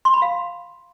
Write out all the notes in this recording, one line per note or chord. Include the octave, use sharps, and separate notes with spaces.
C6
B5
F5